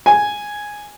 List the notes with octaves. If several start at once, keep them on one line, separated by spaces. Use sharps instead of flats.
G#5